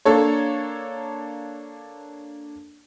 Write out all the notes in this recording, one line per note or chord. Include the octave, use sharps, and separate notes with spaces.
A#3 D4 A4 C#5